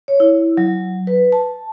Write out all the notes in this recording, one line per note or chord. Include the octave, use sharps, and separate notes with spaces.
C#5
E4
F#3
B4
A5